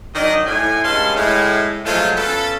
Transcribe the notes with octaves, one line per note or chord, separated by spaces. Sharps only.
D#3 F#3 D4 D#5
A2 G#5
G2 G#3 C#4 F5 A5 C6
A2 G#3
F3 F#3 G#3 A3 C#4 F4
B3 C#4 F4 A4